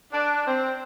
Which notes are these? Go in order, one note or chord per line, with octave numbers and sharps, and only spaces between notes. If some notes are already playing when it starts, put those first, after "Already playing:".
D4
C4